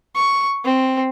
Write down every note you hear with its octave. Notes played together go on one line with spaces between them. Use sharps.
C#6
C4